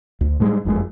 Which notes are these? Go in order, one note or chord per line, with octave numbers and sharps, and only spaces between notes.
D2
A2 G3 G#3
F#1 F2 G#2 G#3